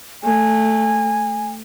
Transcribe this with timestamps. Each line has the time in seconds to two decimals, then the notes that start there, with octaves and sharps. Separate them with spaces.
0.23 A3 G#5